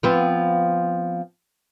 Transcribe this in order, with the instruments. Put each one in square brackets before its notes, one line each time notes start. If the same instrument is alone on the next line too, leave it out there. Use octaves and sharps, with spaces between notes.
[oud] F3 B3 C4